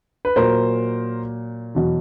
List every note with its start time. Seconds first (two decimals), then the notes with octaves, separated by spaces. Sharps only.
0.25 B4
0.36 A#2 F#3 A#4 C5
1.75 E2 B2 F#3